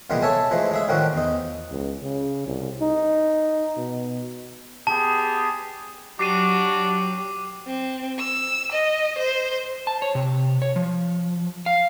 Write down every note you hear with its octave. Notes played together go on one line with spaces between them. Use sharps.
C2 A#2 E3 G3 G#3 B3
A4 C#5 E5 G#5 A5
E3 F3 G#3 A3
G#3 G#4 E5
A2 D#3 F3 G3 F#4
E2 D#4
C#2
C#3
C2
D#4
B2
B3 G4 G#4 A5
F#3 D4 F#4 G4 D6 C7 D#7
C4
E6
D#5
C5
A5
C#5
C3
C#5
F3
F5